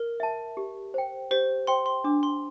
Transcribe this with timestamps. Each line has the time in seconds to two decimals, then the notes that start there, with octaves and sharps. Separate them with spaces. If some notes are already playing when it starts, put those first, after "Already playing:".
Already playing: A#4
0.20 E5 A5
0.57 G4
0.94 C5 G5
1.31 G4 C5
1.67 C5 G5 C6
1.86 C6
2.04 D4 D6
2.23 C6